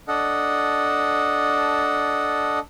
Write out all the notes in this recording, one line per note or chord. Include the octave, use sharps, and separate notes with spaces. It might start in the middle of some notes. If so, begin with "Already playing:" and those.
D4 A4 D#5 F#5